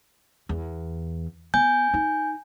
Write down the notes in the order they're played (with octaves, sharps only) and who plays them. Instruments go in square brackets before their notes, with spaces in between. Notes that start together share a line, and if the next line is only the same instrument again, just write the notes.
[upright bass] E2
[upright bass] B3 [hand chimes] G#5 G6
[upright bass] D#4